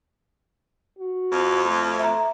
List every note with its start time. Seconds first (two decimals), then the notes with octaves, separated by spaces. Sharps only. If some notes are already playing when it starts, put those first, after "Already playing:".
0.98 F#4
1.32 F2
1.65 A3
1.99 E5 A#5